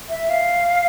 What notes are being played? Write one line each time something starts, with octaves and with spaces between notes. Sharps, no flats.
E5
F5